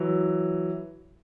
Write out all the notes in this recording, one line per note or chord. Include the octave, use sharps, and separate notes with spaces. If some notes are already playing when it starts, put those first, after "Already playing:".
Already playing: E3 F#3